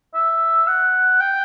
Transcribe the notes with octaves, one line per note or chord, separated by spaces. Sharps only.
E5
F#5
G5